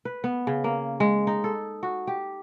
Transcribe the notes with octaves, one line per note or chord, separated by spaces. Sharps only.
B4
B3
C#3
A#3
G#3
D#4
A4
F#4
G4